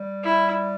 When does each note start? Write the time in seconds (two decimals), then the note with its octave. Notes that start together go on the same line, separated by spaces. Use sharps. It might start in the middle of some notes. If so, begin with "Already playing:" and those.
Already playing: G3
0.23 E4